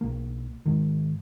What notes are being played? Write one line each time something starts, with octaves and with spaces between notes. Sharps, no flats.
B1 A#3
G#2 D#3